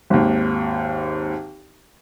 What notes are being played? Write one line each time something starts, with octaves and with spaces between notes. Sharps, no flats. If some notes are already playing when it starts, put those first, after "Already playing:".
G#1 D#2